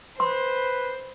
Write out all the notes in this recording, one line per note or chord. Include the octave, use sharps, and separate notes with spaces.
B4 C5 C6